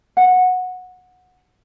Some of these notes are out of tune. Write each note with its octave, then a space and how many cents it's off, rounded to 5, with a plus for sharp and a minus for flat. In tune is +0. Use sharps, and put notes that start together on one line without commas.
F#5 -15